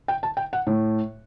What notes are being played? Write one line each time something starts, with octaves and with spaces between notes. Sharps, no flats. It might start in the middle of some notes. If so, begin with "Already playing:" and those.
G5
A5
G5
F#5
A2